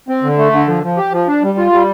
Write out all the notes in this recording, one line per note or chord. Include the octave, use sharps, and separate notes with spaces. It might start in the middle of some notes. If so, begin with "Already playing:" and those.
C4
D3
A3
D3
F3
F3
G4
F3
D4
G3
F4
G3